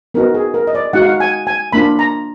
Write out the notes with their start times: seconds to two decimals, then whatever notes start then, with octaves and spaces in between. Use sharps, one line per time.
0.14 B3 D#4 F#4 A#4
0.34 G#4
0.54 A#4
0.67 D#5
0.75 D5
0.93 G#3 D#4 F#4 F#5
1.02 F5
1.09 F#5
1.20 G#5
1.47 G#5
1.73 A#3 D4 F4 B5
1.99 A#5